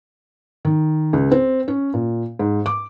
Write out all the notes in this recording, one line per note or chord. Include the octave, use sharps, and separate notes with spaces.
D#3
C#2
C4
C#4
A#2
G#2
D6